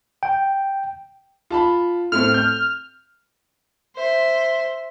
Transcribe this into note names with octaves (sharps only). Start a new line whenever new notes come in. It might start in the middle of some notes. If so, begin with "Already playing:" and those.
G5
F4 A5 B5
A2 A3 C4 F6
G6
C5 E5